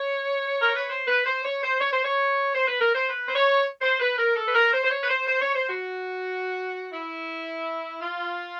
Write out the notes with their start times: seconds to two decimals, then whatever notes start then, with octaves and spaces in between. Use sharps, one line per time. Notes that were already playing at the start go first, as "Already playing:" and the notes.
Already playing: C#5
0.62 A#4
0.75 B4
0.90 C5
1.08 B4
1.26 C5
1.45 C#5
1.63 C5
1.80 C#5
1.93 C5
2.05 C#5
2.54 C5
2.68 B4
2.81 A#4
2.95 C5
3.09 B4
3.28 C5
3.35 C#5
3.82 C5
4.00 B4
4.18 A#4
4.36 A4
4.46 B4
4.55 A#4
4.73 C5
4.84 C5
4.91 C#5
5.02 B4
5.09 C5
5.27 C5
5.41 C#5
5.55 C5
5.69 F#4
6.92 E4
8.01 F4